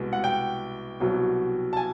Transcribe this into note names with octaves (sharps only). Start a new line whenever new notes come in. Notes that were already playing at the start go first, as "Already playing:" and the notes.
Already playing: C2 B2 G#3 B3
F#5
G5
C2 B2 F#3
A5
G#5